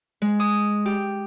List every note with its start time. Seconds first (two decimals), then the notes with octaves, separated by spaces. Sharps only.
0.22 G#3
0.40 D#6
0.86 G4